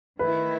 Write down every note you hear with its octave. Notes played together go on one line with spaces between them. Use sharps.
D#3 A3 E4 B4